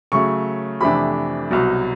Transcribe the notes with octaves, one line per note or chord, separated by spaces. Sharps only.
C#3 F#3 A3 C#6
F2 C3 E3 A3 D4 B5
C2 B2 F#3